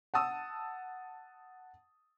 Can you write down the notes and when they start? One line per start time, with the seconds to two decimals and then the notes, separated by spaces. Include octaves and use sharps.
0.14 F#5 A5 D#6 E6